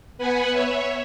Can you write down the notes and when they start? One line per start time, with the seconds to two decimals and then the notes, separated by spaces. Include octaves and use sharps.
0.18 B3 B4 F#5 G#5 B5
0.51 C#5 E5